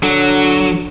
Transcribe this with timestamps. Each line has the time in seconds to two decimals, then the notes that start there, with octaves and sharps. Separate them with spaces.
0.03 D3 F#3